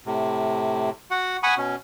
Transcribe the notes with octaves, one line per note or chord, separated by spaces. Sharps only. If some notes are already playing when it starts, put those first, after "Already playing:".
A2 C3
F#4 F#5
F#5 G#5 B5 C#6 D#6
B2 C#4